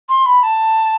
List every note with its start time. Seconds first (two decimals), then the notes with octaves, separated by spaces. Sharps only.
0.09 C6
0.26 B5
0.43 A5